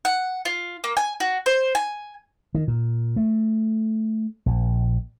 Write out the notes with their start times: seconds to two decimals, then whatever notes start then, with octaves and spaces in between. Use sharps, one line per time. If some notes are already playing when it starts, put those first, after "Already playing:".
0.05 F#5
0.45 F4
0.84 A#3
0.97 G#5
1.20 F#4
1.46 C5
1.75 G#5
2.55 D#3
2.68 A#2
3.16 A3
4.46 A#1